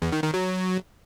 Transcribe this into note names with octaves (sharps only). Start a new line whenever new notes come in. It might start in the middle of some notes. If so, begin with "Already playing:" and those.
E2
D#3
D#3
F#3